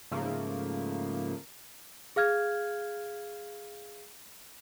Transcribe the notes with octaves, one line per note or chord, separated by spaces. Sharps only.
G#2 C#3 F3 A3 A#3
G#4 F5 F6 G#6